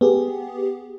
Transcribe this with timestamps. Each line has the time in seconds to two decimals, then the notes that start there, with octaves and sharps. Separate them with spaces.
0.01 B3 G4 G#4